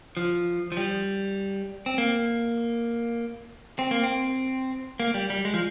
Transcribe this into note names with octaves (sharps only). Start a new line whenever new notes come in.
F3
F3
G3
C4
A#3
C4
A#3
C4
A#3
G3
G3
G#3
F3